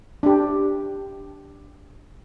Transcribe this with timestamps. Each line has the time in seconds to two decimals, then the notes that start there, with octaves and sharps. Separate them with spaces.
0.23 D4 G4